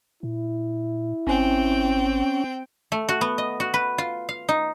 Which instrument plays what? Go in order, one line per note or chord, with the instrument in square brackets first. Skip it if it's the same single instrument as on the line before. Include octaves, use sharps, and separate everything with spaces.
[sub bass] A#2 [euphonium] E4
[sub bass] G#1 [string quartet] C4 G5 [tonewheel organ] C#4
[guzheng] A3
F#4
B3
D#5
F#4
B4
F4
F5
D#4